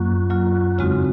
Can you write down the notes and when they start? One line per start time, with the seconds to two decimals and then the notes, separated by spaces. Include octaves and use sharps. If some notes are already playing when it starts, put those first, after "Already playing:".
Already playing: F#2 F#3 A#3 F4
0.30 F#3 A#3 F4
0.78 F2 C#3 G#3 C4 D#4 F#4